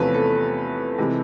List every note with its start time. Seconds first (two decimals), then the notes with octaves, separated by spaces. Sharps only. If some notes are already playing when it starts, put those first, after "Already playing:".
Already playing: E2 C3 F3 A3 C#4 B4
0.14 A4
0.98 C3 E3 G#3